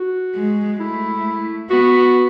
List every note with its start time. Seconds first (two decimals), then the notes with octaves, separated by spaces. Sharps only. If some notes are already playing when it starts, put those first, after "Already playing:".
Already playing: F#4
0.35 G#3
0.79 A3 E4
1.70 B3 F#4